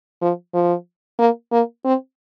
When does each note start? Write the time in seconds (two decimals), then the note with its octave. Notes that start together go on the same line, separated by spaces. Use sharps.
0.21 F3
0.54 F3
1.19 A#3
1.51 A#3
1.85 C4